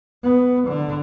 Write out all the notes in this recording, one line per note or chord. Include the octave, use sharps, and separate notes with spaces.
B3
D3